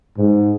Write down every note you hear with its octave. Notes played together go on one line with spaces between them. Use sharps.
G#2